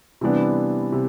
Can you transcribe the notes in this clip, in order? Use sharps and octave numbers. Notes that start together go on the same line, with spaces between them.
C3 E3 G3 B3 D4
C3